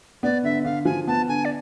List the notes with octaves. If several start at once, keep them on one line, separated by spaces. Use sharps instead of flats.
B3 D5
D3 E5
D3 F5
F3 G#5
B3 A5
D3 G#5
D5